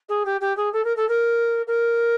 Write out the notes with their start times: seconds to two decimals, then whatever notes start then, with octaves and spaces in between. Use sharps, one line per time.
0.09 G#4
0.25 G4
0.41 G4
0.57 G#4
0.73 A4
0.84 A#4
0.96 A4
1.08 A#4
1.67 A#4